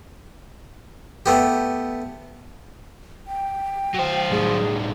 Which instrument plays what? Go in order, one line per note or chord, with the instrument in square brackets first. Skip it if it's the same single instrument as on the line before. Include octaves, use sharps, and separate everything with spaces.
[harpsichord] A3 B3 G4
[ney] G5
[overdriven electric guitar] F#3 C5
[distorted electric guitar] A2 G3 [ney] G#4